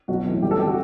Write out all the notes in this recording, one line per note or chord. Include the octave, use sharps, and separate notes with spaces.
B1 F#4
A2 E3
G1 G4
A4
G4
D3
F#4